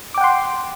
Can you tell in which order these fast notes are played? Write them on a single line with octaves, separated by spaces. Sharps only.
D6 G5 F#5 C6